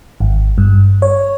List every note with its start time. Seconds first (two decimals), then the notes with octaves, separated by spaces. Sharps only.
0.20 G#1
0.58 G2
1.02 C#5